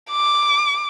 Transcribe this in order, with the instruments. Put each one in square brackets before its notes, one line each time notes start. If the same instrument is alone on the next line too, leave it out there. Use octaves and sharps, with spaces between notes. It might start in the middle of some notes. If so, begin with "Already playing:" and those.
[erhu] D6